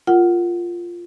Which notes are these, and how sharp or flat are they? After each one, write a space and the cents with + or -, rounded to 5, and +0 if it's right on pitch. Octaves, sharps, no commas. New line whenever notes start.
F4 -5 A#4 -15 F#5 +10